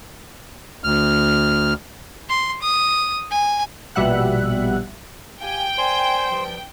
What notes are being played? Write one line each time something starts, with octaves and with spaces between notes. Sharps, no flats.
D2 F6
C6
D#6
G#5
A#1 B2 G3 E5 F#5 F#6
G4 F5 G5 G#5
A#4 C5 D5 G#5
G2 F3